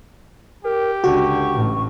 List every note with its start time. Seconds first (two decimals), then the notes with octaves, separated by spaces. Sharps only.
0.65 G4 A#4
1.04 C#2 D3 F#4 C#6
1.53 A1 A2